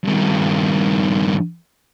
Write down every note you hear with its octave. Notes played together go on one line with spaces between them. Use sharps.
G2 D#3